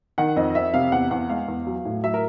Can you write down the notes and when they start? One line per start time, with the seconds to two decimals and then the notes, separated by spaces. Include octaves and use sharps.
0.18 D#3 F#5
0.36 F2 D#5
0.55 F2 E5
0.74 C3 F5
0.92 E2 F#5
1.11 E2 F#5
1.29 G#3 F5
1.48 E2
1.67 F#3
1.85 A2
2.04 F#3 E5
2.14 A#4